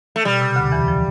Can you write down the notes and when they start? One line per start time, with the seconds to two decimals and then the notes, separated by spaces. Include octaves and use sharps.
0.16 A3
0.25 B2 G3
0.41 C3
0.56 D2 D3
0.72 E2 E3
0.88 F3